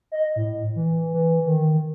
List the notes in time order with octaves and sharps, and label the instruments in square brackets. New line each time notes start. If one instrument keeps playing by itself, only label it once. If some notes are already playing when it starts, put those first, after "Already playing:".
[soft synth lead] D#5
A2
E3
E3
D#3